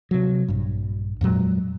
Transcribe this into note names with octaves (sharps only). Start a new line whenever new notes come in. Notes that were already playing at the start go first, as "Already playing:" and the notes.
C3 F#3
A#1 G2
F2 A#2 F#3 G#3